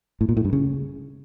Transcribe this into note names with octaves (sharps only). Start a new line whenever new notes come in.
A2
A#2
A2
G2
C#3